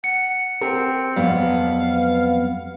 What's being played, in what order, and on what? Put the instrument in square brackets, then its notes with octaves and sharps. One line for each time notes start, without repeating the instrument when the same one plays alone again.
[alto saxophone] F#5 [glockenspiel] C#7
[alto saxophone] C4 [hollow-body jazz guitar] G4 G#4 A#4
[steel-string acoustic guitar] F2 B3 [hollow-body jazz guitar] F#3 G3 [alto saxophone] F5